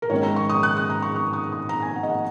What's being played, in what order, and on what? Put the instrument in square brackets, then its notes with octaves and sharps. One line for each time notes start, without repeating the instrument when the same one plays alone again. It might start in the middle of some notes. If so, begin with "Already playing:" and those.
[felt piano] A#4
G#2 D#3 G#3 C#4 C#5
A#5
C#6
D#6
F#6
D#6
A#5
C#6
D#6
D#6
D#6
A#5
G#5
F#5
D#5
F#5